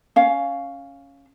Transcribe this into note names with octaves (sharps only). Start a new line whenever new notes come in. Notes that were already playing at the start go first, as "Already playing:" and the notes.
C#4 F5